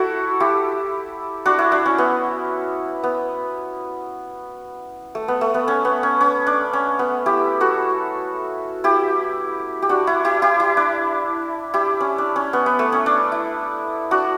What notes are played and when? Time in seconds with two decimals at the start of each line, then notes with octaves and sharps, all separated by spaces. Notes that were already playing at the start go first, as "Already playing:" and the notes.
Already playing: E4 F#4 A4
0.40 E4 G4
1.46 D4 F#4
1.59 E4
1.72 D4
1.86 C#4
1.98 B3
3.04 B3
5.15 A3
5.28 B3
5.41 A3
5.54 B3
5.68 C#4
5.85 B3
6.03 C#4
6.21 C#4
6.47 D4
6.73 C#4
6.99 B3
7.26 E4 G4
7.61 F#4 A4
8.84 E4 G4
9.82 G4
9.89 D4 F#4
10.07 E4
10.25 E4 G4
10.42 E4 G4
10.60 E4
10.77 D4
11.74 E4 G4
12.00 C#4
12.18 D4
12.36 C#4
12.53 B3
12.66 B3
12.79 A3
12.92 C#4
13.06 D4
13.32 E4
14.11 D4 F#4